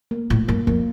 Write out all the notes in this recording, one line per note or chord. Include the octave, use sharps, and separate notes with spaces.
A#3
A2 F4
G2 A#3
F2 A#3